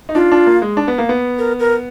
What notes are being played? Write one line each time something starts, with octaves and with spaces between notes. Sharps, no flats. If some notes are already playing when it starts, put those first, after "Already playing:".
D#4
D4 F4
D4
A#3
G#3
D4
B3
A#3
B3
A#4
A#4